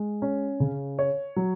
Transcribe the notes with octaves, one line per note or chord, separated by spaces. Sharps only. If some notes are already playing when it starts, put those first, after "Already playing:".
Already playing: G#3
C#4
C#3
C#5
F#3